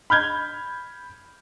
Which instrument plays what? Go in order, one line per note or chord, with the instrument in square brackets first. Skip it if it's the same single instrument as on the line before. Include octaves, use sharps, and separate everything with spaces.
[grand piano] B5 F6 G6 G#6